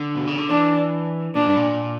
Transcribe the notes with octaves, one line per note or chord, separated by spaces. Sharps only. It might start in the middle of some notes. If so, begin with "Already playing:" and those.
Already playing: D3
B2
C#3
D3
E3 D4
A#2 D4
G2
A#2